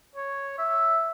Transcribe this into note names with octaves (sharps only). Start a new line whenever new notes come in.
C#5
E5